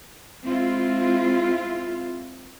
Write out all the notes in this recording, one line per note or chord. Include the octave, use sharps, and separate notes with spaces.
G#3 C4 E4 F4